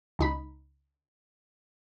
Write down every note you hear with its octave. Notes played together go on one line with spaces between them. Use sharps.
C#2 D#4 B5